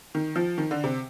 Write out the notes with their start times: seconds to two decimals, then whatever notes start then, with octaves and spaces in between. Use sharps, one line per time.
0.15 D#3
0.36 F3
0.58 D#3
0.71 D3
0.84 C3